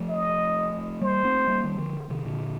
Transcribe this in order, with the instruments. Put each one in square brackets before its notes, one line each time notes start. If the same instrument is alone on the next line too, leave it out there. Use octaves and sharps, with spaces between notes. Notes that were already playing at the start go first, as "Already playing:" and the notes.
Already playing: [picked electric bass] F3 A3
[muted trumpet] D#5
[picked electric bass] G3 A#3 [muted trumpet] C5
[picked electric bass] A3 C4
G3 A#3
D#3 G3
D3 F3
C3 D#3
A#2 D3